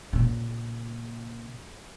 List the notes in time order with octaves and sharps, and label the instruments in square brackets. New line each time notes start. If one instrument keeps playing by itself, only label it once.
[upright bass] A#2 C#3